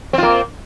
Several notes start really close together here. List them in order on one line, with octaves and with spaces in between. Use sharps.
C4 F4 A#3